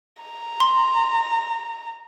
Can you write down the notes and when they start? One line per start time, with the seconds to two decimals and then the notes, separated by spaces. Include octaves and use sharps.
0.23 A#5
0.60 C6